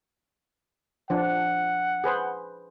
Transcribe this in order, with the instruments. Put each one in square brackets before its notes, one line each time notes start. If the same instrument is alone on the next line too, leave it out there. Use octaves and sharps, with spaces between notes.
[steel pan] F3 D4 [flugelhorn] F#5
[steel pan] G#4 B4 C5